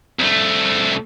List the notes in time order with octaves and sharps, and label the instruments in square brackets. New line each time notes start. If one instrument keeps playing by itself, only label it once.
[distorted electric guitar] C2 A3